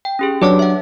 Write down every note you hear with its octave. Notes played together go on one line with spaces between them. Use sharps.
G5
C#4 G4 G#4
F#3 D4 B4 C#5 A5 D6
E5 F#5